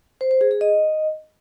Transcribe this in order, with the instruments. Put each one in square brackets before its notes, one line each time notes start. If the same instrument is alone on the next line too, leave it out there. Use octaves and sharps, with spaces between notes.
[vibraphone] C5
C5
G#4
G#4
D#5